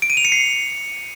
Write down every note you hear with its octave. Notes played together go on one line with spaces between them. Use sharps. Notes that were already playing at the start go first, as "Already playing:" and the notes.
D7
D#7
F7
C#7
C7